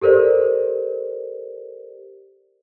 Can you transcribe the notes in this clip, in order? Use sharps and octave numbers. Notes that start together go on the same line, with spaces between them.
G4 A4 A#4 C5 D5